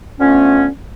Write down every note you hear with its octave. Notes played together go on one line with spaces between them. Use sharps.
D3 F3 A3 B3 C#4